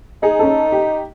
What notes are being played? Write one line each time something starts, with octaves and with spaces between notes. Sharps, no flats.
D#4 G#4
C#4 A4
G4